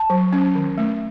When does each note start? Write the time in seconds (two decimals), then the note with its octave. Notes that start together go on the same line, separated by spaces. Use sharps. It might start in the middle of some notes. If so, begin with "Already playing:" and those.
Already playing: A5
0.10 F#3
0.33 C#4
0.55 D#3
0.78 A3